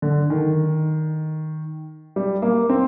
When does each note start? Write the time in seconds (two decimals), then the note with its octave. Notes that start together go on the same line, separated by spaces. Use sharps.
0.02 D3
0.30 D#3
2.16 G3
2.42 A#3
2.69 C4